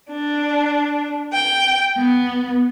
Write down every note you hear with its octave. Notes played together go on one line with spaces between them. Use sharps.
D4
G5
B3